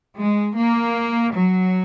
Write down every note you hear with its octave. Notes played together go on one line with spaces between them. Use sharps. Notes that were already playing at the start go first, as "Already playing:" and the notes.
G#3
A#3
F#3